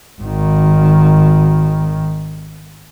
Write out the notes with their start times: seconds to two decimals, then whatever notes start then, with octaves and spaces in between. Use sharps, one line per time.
0.22 G#1 D#3